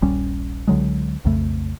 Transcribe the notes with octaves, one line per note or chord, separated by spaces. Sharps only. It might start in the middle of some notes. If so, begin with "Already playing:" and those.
D#1 A#1 G3 C#4
C#2 D3 F#3 G#3
B1 F2 C#3 A3